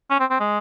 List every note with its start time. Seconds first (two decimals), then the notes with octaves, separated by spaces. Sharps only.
0.10 C#4
0.20 C4
0.30 C4
0.40 G#3